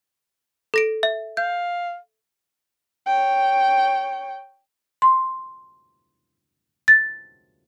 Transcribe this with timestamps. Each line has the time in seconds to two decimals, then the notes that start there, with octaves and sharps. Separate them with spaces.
0.74 A4 A#6 D7
1.03 E5
1.37 F5 G6
3.06 C#5 G5
5.02 C6
6.88 A6